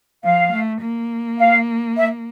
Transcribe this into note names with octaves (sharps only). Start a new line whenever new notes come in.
F3 F5
A3
A#3
F5
E5